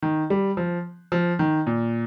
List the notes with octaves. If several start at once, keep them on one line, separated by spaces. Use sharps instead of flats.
D#3
G3
F3
F3
D#3
A#2